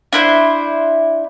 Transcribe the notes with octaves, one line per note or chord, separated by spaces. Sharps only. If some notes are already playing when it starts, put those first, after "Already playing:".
D4 E4 C5